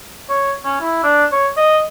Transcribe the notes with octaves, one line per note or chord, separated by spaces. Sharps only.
C#5
C#4
E4
D4
C#5
D#5